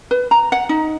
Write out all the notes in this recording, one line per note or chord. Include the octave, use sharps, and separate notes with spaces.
B4
A#5
F#5
D#4